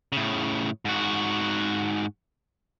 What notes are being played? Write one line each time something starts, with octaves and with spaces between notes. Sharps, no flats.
A2 C#3
G#2 F#4